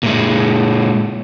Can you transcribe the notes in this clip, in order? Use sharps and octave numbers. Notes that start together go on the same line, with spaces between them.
A#2 G#3